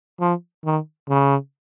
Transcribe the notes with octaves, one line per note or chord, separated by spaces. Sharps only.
F3
D#3
C#3